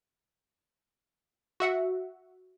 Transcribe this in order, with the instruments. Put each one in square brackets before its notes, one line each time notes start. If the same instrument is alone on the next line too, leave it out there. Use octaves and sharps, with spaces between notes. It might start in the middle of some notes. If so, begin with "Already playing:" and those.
[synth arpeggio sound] F#4 E5 F#5